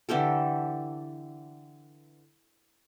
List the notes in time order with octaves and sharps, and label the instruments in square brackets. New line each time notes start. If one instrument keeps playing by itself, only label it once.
[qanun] D3 E3 G4 A4